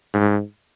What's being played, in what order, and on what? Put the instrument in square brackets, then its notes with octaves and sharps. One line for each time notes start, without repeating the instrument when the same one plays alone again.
[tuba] G#2